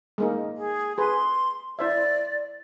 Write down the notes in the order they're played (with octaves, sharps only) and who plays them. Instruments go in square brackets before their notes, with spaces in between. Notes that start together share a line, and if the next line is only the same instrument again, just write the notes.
[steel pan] G#3 A#3 D#4
[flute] G#4
[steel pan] G#4 B4 [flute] C6
[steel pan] E4 C5 E5 [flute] D5